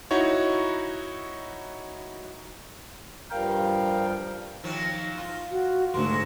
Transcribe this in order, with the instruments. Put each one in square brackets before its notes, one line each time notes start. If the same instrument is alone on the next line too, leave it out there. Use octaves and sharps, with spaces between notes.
[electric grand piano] D#4 E4 F#4 C#5
[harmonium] G2 F3 G3 [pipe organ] A#4 F5 G5
[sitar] D#3 F3 F#3
F4
[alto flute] F#4
[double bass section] D2 G#2 [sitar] F#3 A#3 [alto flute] C6